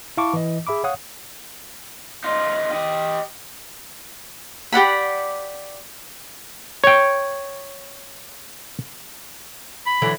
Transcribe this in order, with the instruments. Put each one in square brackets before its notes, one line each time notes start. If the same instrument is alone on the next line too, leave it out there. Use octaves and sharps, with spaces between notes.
[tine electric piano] E4 F5 A5 C#6 D6
E3 D#5
G#4 E5 B5 D6
C#5 F5 F#5 D#6
[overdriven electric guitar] D#4 F4
G4 D#5
[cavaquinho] G4 D5 F#5 B5
[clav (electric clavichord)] C#5 G5
[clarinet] B5
[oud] D3 E3 F#3